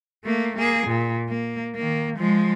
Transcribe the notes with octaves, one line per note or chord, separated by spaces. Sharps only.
A3 A#3
A#3 G#4
A#2
A#3
D#3 A#3
F3 G#3